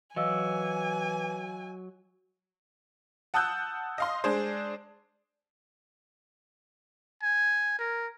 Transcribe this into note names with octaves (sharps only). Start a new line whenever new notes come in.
E3 F#3 D#5 F5 G#5 E6
F#5 A5 D#6 E6 F#6 G6
D#5 F5 C6
G#3 D4 G#4 C5
G#5
A#4